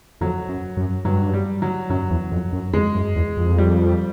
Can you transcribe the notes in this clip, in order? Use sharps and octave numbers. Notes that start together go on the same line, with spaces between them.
F2 F#3
F#2
F#2
G2 F#3
G3
F#3
F#2 F#3
E2
F2
F#2
F2 G#3
F#2
E2
F2
G3